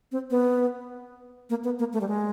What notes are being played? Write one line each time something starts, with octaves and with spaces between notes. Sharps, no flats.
C4
B3
A#3
B3
A#3
A3
G3
G#3